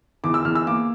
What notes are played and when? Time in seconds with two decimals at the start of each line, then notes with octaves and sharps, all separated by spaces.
0.24 E2 D6
0.34 E6
0.45 E2 F6
0.55 E6
0.66 A#3 D6